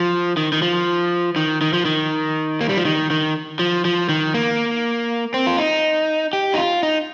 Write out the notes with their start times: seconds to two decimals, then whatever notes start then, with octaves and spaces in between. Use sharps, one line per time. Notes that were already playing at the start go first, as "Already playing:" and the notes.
Already playing: F3
0.37 D#3
0.52 D#3
0.62 F3
1.36 D#3
1.61 D#3
1.73 F3
1.85 D#3
2.61 A#3
2.69 G3
2.77 F3
2.85 D#3
3.11 D#3
3.59 F3
3.85 F3
4.09 D#3
4.34 A#3
5.34 C4
5.47 F4
5.58 D#4
6.33 G4
6.54 D#4
6.58 F4
6.83 D#4